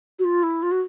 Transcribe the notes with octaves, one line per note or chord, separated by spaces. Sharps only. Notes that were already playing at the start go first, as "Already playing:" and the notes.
F#4
F4
E4
F4
F#4